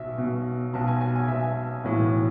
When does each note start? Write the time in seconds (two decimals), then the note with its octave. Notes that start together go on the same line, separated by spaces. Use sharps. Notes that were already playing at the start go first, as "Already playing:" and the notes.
Already playing: B1 B2 E5
0.18 B1 B2
0.73 B1 B2 A5
0.88 G#5
1.01 G#5
1.16 G#5
1.28 B1 B2 E5
1.84 B1 A2 E3